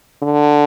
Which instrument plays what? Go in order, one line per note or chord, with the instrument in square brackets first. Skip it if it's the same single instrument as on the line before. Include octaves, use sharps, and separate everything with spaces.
[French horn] D3